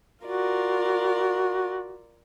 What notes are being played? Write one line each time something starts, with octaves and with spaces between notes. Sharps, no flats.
F4 F#4 A#4 D5